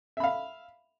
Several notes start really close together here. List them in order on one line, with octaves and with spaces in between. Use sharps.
E5 B5 F5